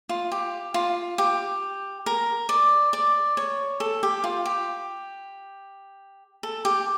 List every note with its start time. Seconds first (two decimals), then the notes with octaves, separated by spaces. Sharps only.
0.09 F4
0.32 G4
0.74 F4
1.18 G4
2.06 A#4
2.49 D5
2.93 D5
3.37 C#5
3.80 A4
4.03 G4
4.24 F4
4.46 G4
6.43 A4
6.65 G4